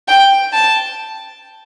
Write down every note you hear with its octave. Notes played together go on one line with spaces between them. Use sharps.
G5
A5